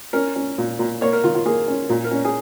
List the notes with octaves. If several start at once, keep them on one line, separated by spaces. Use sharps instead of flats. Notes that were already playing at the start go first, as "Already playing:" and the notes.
C#4 A#4
C#4
A#2
A#2
A#3 C#5
A#4
D#3 F4
F4
A#3 G#4
C#4
A#2
A#4
C#4
G#4